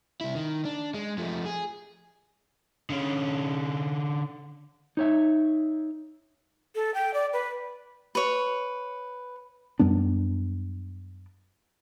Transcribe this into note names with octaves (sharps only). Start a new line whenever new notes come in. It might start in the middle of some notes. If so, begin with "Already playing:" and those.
C2 E4
D#3
D4
G#3
F3 A3
G#4
D3 C#4
D#4 C#5 E5
A4
G5
D5
B4
B4 C#5
F#2 G3 B3 D4